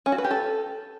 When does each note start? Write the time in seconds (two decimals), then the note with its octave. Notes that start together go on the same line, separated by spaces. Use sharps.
0.06 C#4
0.12 F#4
0.18 B4
0.24 G4
0.31 A4